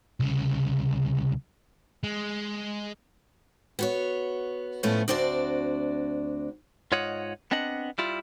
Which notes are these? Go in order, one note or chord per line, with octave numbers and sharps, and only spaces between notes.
C2 C#3
G#3
B3 F#4 C#5
A2 F3 A3 B3 C#4 E4
D2 C4 D4 F#4 D5
G#2 F4 C#5 D#5 F#5
B3 C4 D4 D#5 F#5
G3 E4 F4